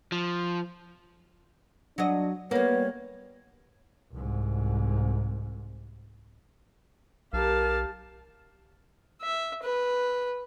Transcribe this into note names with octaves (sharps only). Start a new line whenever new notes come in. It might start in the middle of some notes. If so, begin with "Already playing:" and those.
F3
F#3 D4 D#5
G3 A#3 B3 C#5
C2 G#2
B1 G4 A#4 F5 A5
E5
B4